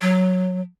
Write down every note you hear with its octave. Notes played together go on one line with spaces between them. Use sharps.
F#3